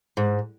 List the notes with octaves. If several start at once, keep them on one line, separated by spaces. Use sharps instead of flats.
G#2